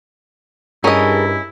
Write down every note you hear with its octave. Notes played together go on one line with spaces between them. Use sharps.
G2 C#4 E4 G#4 A#4 D#5